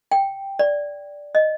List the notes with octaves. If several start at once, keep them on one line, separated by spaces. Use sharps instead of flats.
G5
D5
D#5